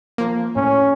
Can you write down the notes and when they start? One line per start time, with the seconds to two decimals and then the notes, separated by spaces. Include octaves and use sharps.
0.18 F3 A#3
0.56 A2 C#4